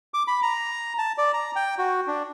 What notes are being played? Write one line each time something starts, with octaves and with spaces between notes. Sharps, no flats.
D6
B5
A#5
A5
D5
A#5
G5
F#4
D4